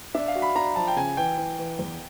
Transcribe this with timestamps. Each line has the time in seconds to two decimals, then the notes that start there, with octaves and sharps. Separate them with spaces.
0.14 D4 E5
0.28 F5
0.35 F#4
0.42 B5
0.55 D4 A#5
0.76 F3 A5
0.88 G5
0.96 C#3 G#5
1.17 E3 G5
1.37 E3
1.59 E3
1.79 E2